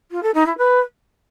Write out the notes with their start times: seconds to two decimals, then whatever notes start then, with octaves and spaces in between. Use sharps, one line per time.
0.11 F4
0.23 A4
0.35 D#4
0.46 E4
0.58 B4